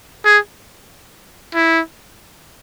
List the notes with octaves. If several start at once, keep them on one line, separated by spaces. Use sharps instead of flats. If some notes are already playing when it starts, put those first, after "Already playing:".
G#4
E4